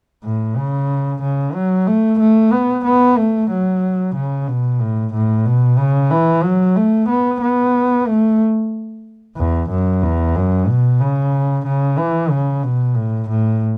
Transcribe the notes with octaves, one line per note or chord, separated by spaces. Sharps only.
A2
C#3
C#3
F#3
A3
A3
B3
B3
A3
F#3
C#3
B2
A2
A2
B2
C#3
E3
F#3
A3
B3
B3
A3
E2
F#2
E2
F#2
B2
C#3
C#3
E3
C#3
B2
A2
A2